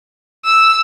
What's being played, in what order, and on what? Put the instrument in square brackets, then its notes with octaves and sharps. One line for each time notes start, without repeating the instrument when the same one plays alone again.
[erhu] E6